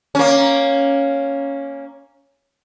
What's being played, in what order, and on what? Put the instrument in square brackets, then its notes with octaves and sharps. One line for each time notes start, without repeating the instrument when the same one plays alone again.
[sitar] A#3 C#4